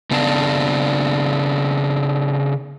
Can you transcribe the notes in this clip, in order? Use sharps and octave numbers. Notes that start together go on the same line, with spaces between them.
C#3 B3 D4 F5 A5